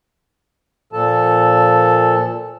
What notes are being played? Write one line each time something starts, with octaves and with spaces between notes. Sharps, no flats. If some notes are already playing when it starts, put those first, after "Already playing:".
A#2 F3 A4 A5